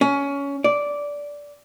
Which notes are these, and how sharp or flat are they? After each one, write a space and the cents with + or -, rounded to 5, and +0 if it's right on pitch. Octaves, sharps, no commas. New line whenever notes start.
C#4 +20
D5 -10